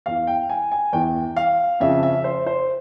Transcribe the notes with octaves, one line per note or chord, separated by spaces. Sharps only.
E2 E3 F5
G5
G#5
G#5
E2 E3 G5
F5
F2 C#3 F3 E5
E5
C5
C5